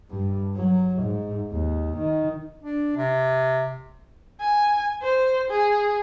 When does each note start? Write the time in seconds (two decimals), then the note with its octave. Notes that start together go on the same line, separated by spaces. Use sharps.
0.11 G2
0.55 F#3
1.03 G#2
1.52 D#2
1.98 D#3
2.63 D4
2.97 C3
4.41 G#5
5.02 C5
5.50 G#4